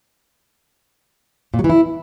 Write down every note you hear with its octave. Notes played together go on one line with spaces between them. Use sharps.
A#2
F#3
E3
E4